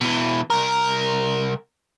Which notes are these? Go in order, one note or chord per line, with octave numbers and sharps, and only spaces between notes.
B2 E3
C2 A#4